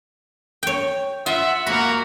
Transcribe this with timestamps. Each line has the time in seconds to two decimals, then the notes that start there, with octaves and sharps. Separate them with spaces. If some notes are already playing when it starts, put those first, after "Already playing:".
0.63 C#5 G5
1.26 F4 E5 F#5
1.66 A#3 F#4 A#4 B5